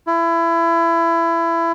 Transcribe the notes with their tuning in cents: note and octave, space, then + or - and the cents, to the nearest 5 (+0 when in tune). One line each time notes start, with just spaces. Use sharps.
E4 +25